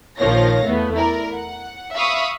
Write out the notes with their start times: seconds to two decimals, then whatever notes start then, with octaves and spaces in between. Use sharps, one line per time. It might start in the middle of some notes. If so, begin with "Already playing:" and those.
0.19 A#1 D#3 F3 C#5 F5 A#6
0.65 E2 A3 B3
0.96 E4 A#4 D5
1.33 F#5
1.95 E5 F5 B5 C#6 D#6